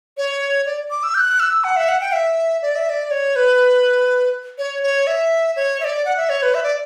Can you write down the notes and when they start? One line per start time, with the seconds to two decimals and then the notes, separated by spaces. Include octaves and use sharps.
0.18 C#5
0.66 D5
0.91 D6
1.03 E6
1.15 G6
1.18 F#6
1.40 E6
1.64 F#5
1.77 E5
1.89 F#5
2.01 G5
2.13 E5
2.62 D5
2.76 E5
2.90 D5
3.11 C#5
3.36 B4
4.58 C#5
4.83 C#5
5.07 E5
5.56 C#5
5.80 E5
5.84 D5
6.05 F#5
6.17 E5
6.29 C#5
6.42 B4
6.54 E5
6.63 D5